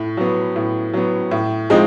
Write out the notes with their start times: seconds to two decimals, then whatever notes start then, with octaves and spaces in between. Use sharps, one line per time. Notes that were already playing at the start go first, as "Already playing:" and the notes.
Already playing: A2
0.17 F#3 B3
0.56 A2
0.94 F#3 B3
1.31 A2
1.70 F3 G#3 C4 D#4